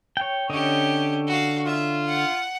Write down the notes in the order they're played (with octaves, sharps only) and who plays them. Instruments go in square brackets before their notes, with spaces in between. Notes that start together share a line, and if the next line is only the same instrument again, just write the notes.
[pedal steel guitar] C#5 G5
[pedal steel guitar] D3 C#5 D#5 [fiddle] C#4 G4
[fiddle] F#4 F5
[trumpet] F4 [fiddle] E5
[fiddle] F#5